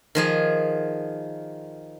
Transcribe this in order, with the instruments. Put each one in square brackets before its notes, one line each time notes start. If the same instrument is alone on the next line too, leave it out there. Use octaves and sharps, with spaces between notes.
[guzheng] D#3 F3 G#4